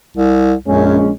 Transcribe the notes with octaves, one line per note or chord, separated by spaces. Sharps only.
C2
A#1 F#2 G#3 C#4